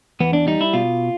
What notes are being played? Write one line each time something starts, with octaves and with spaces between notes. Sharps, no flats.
E2 B3
D4
G3 D#4
E4
B2 F4